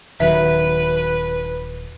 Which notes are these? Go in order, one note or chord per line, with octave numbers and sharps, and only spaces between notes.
D#1 D#3 F#3 B4 E5